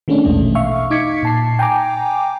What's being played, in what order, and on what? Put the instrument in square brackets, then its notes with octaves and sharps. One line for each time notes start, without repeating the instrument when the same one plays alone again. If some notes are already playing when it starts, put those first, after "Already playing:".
[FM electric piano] D#3 G#3 A3 C#4 D4
A#1 E2 B2 A3
E5 F5 C#6 F6
D#4 D6 G#6 B6 C#7
A#2 A5 C7
G5 G#5 A#5 D6